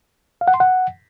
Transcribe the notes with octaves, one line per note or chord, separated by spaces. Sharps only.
F5
F#5
C6
F#5